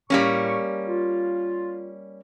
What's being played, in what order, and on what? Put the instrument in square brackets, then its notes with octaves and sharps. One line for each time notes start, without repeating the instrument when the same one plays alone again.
[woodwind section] A2 C#6 [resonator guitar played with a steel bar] G3 A#3 C#4
[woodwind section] F4